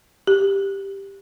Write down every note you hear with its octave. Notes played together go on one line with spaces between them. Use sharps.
G4